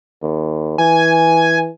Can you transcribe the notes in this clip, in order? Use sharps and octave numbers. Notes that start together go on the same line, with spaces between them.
D#2
E3 G#5